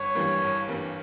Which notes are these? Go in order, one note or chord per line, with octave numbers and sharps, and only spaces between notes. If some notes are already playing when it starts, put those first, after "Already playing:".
Already playing: G1 C#5
G2 E3 G3 A#3
G1
G2 E3 G3 A#3